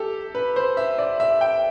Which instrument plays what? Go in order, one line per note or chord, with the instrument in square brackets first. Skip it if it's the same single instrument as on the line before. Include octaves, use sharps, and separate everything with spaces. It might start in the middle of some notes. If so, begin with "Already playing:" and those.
Already playing: [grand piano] G4 A4
B4
C5
E5
D5
E5
G5